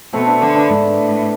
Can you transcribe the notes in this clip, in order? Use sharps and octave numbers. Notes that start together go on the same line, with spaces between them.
B2 A3 C4
B3 D4
D3 B3 D4
B3 D4
G#2
A2